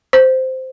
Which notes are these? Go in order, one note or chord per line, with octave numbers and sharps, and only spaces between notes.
C5